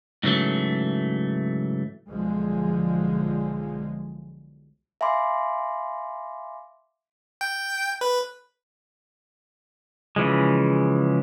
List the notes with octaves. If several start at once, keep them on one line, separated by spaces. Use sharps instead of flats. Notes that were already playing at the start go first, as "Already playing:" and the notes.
G#2 C#3 E3 F#3 A3
B1 D3 F3 G#3
E5 F5 G#5 B5 C6 D6
G5
B4
C#3 E3 F3 G#3